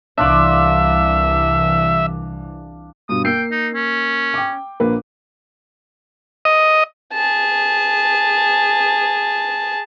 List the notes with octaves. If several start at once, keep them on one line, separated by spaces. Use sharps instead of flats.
C2 E3 D4 F4 D5 E5
G2 B2 D#6
A#3 G5 E6 C7
D#4
C#4
G5 D6
A#1 A#3 B4
D#5
G#4 A5